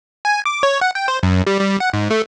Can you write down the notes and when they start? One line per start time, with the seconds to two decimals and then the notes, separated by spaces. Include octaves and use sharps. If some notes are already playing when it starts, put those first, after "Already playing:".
0.25 G#5
0.45 D6
0.63 C#5
0.81 F#5
0.95 G5
1.08 C5
1.23 F#2
1.47 G3
1.60 G3
1.80 F#5
1.93 G#2
2.11 A3